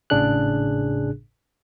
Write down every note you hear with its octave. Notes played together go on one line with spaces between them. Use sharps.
G#1 A2 C#3 D4 G#4 F#6